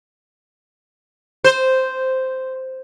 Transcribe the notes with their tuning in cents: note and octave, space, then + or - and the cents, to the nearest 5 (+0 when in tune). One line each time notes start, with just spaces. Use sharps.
C5 -5